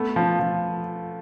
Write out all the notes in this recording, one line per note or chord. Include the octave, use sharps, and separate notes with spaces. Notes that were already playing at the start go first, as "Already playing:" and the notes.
Already playing: A3 B3
F3
F3